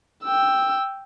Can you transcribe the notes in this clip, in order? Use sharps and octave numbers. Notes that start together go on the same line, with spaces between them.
G5 E6